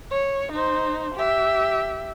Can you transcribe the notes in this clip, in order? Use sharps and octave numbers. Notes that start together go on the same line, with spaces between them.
C#5
D#4 C5
G4 E5